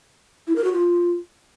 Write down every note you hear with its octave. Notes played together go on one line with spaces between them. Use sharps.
E4
A#4
F#4
F4